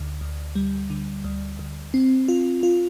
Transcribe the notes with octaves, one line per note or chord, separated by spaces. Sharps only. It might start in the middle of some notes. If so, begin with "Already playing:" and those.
Already playing: D2 D3
D2
G3
D3
D2
D2
C4
F4
F4